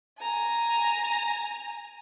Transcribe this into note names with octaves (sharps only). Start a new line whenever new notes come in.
G#5 A#5